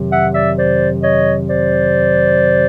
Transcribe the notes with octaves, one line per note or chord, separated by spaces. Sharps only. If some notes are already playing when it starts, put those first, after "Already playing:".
Already playing: F2 C3 D#3 F#3
E5 F#5
D5 E5
C5 D5
C#5 D#5
C5 D5